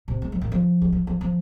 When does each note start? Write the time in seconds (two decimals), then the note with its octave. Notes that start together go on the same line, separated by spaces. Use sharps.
0.08 C3
0.22 G#3
0.32 F3
0.41 D#3
0.52 F3
0.82 G#3
0.92 F3
1.07 F3
1.21 F3